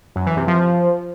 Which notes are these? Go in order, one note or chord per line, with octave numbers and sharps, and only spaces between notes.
F#2
E3
C3
F3